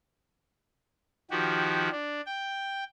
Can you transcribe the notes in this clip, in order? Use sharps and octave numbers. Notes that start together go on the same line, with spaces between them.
D#3 F3 F#4 G4
D4
G5